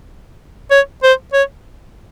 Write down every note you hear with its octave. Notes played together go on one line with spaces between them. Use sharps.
C#5
C5
C#5